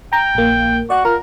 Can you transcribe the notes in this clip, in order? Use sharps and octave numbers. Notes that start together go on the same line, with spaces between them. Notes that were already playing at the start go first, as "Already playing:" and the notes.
G5 A#5
A#1 A#3
F#4 D5 F#5 F#6
F4 A#4 A#5